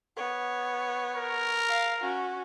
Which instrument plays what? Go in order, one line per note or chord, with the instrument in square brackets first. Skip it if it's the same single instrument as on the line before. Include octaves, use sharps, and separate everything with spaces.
[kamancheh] B3 C#5
[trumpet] A#4
[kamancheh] F5
C#4 F#4